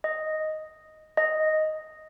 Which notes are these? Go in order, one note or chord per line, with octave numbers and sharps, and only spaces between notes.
D#5
D#5